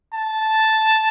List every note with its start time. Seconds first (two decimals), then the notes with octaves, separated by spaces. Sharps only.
0.14 A5